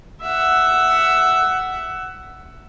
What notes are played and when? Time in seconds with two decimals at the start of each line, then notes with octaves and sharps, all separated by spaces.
0.22 E5 F#5